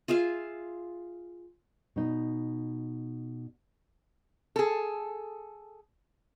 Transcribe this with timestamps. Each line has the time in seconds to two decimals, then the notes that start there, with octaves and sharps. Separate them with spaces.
0.08 F4 G#4 E5 F5
1.96 B2 D#4
4.56 G#4 A4